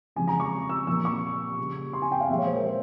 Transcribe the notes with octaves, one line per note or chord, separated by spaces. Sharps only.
C#3 F3 G#3 G#5
A#5
C#6
E6
A#2 F3 A#3 E6
C#6
C#3 G3 A#3
C6
G#5
G5
F5
A#2 F3 G#3 E5
C#5
C5
A#4
C5